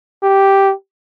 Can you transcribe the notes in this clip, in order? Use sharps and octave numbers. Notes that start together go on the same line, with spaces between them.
G4